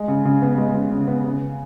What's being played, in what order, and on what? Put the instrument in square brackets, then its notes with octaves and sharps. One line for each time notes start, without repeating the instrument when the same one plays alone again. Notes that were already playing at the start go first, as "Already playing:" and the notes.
Already playing: [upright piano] G#3
C#3
C#3
B3
G#3
C#3
C#3
B3
C#3